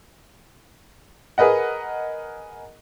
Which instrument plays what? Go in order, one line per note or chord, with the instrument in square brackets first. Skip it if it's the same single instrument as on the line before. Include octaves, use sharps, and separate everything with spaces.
[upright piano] G#4 A#4 B4 D#5 F#5